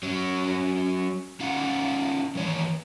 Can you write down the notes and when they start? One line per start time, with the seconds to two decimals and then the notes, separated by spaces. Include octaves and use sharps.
0.03 F#3 C#4
1.40 C#4 D#4 F5 F#5
2.35 D#3 E3 C#5